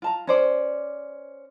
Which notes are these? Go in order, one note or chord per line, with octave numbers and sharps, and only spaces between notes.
F4 A5 A#5
C#4 C5 D5